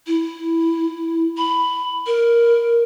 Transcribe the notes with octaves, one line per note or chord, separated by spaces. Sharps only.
E4
B5
A#4